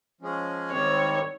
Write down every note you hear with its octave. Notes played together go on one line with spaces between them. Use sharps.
F3 G#3 C#4 G#4
G#2 D#3 G3 C4 C#5